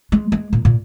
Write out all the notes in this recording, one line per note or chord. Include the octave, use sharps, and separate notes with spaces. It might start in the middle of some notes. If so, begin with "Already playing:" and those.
G#3
G#3
A#2
A#2